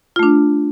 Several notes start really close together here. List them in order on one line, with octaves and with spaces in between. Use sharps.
F4 A3 D4